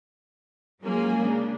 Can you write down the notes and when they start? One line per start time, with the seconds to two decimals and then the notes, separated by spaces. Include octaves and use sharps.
0.82 F#3 G#3 A#3 C#4 F4 G#4
1.23 C#3 D4